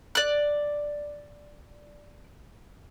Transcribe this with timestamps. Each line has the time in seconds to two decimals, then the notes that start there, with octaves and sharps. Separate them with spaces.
0.15 D5 F#6